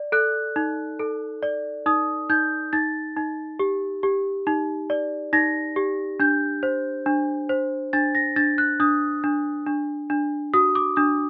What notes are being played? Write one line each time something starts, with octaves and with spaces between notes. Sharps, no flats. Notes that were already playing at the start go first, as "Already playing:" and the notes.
Already playing: D5
A4 F#6
D#4
A4
D5
D#4 D#6
D#4 G6
D#4 A6
D#4
G4
G4
D#4
D5
D#4 A#6
G4
D4 G6
C5
D4
C5
D4 A6
A#6
D4 A6
F#6
D4 D#6
D4
D4
D4
F#4 D#6
D6
D4 D#6